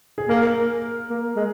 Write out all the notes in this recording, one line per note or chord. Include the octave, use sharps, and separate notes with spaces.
G#4
A#3 A#4
A#3
G#3